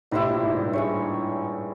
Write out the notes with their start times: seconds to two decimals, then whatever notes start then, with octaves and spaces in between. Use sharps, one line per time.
0.11 A2 E4 G4 C5 D#5
0.28 A#2
0.43 G#2
0.59 G2
0.73 E4 G#4 C#5